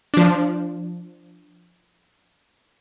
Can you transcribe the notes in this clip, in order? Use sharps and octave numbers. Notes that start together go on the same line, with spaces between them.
F3 D4